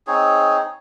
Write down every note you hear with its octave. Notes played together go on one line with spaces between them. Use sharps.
C4 D#4 G#4 C#5